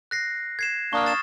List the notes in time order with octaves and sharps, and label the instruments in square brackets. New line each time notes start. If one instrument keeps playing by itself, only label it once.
[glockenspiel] F#6 A#6 C7
G#6 C7 E7
[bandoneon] A#3 D4 [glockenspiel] C#6 D#6 F6
[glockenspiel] A6 E7